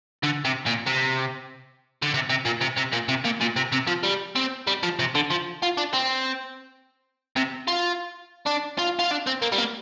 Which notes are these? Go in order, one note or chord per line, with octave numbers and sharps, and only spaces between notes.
D3
C3
A#2
C3
D3
C3
C3
A#2
C3
C3
A#2
C3
A#2
A#2
C3
C3
F3
G3
C4
G3
F3
C3
D3
F3
F4
D4
C4
C3
F4
D4
F4
F4
D4
C4
A#3
G3
A#3